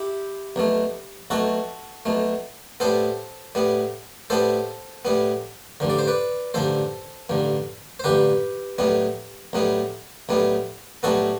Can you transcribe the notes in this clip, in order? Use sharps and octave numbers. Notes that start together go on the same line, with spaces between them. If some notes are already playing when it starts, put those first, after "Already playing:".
Already playing: E4 G4
B1 B2 A3
B1 B2 A3 F#4 A4
B1 B2 A3
A2 G3 B3 A4 C5
A2 G3 B3
A2 G3 B3 A4 C5
A2 G3 B3
A1 G2 D3
D5
C5
B4 D5
A1 G2 D3 A4 C5
A1 G2 D3
C5
A1 G2 D3 G4 B4
B1 A2 G3 B3
B1 A2 G3 B3
B1 A2 G3 B3
B1 A2 G3 B3 F#4 A4